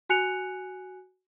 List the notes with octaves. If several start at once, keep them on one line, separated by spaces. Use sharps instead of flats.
F#4 G#5 F#6 C#7 F7